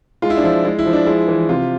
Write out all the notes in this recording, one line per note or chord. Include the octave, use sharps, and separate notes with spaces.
G#3 F4
E4
D4
F3 E4
G#3 E4
E4
F3
D4
G#3 E4
E3
C3 F4